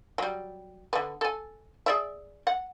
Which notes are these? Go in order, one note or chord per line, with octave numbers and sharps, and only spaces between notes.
F#3 G3
D3 B3
A4 G#5
G#4 D5 E5
F#5